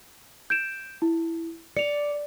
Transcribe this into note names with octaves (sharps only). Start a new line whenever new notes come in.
G6 D7 E7
E4
D5 C#7 F7